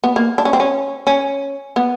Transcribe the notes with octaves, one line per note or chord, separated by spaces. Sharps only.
B3
A#3
D4
C#4
C4
C#4
C#4
B3